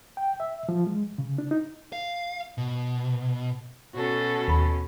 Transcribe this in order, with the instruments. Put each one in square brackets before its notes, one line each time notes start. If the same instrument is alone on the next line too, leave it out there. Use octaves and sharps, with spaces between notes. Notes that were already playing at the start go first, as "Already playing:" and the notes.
[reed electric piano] G5
E5
F3
G#3
C#3
D4
D#4
[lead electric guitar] F5
B2
[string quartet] B2 C#4 [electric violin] F#4 A4
[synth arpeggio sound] D#2 B5